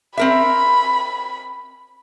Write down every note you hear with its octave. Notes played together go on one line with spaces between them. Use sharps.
C4 A#4 E5 B5